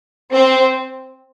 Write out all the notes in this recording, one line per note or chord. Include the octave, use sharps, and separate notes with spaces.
C4